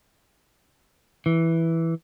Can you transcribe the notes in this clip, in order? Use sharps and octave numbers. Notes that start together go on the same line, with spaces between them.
E3